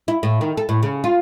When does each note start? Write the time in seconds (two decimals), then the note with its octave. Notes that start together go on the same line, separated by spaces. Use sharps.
0.08 E4
0.23 A2
0.41 D#3
0.57 A4
0.69 A2
0.83 C#3
1.04 F4